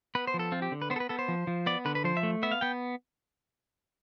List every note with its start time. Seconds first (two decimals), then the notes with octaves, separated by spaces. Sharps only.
0.15 B3 B4
0.27 C5
0.34 F3
0.39 A4
0.52 C4 F4
0.62 G4
0.72 D3
0.82 B4
0.90 B3 C5
0.96 A4
1.00 B4
1.09 B3 A4
1.19 C5
1.28 F3
1.47 F3
1.66 B3 D5
1.85 D3 B4
1.95 B4
2.04 F3 C5
2.17 E5
2.23 A3
2.43 B3 E5
2.52 F5
2.61 B3 G5